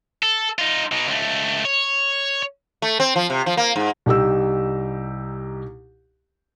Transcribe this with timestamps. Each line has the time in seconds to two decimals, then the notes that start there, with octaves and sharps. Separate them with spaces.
0.23 A4
0.59 D#4 F4
0.92 B2 D#4
1.08 C#2 A3
1.65 C#5
2.82 A3
3.00 C4
3.16 F3
3.30 C3
3.46 F3
3.57 A#3
3.76 G#2
4.06 C2 D#4 G4 E6